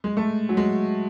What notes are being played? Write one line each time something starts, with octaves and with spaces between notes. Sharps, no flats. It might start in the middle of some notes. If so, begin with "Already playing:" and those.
G#3
A3
F#3
G#3